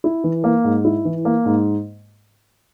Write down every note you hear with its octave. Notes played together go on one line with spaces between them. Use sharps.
E4
E3
A#3
G#2
E4
E3
A#3
G#2